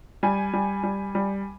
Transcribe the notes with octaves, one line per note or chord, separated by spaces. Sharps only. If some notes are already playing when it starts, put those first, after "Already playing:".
G3 G#5
G3
G3
G3